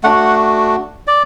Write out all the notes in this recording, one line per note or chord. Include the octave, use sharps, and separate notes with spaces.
A3 D4 F#4 F#5
D5